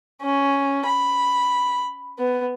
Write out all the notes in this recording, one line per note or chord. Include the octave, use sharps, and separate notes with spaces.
C#4
B5
B3